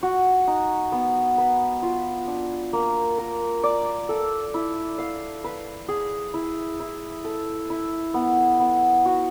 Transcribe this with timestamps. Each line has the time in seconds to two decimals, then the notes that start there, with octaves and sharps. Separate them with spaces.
0.03 F#4
0.47 D#4
0.92 B3
1.38 B4
1.82 F4
2.28 D4
2.73 A#3
3.18 A#4
3.63 D5
4.09 A4
4.54 E4
4.98 F5
5.44 B4
5.89 G#4
6.34 E4
6.80 E4
7.24 A4
7.70 E4
8.14 B3
8.60 B3
9.06 F#4